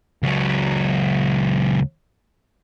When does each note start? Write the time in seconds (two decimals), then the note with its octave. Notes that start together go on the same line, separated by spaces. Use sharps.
0.23 C#2 F#3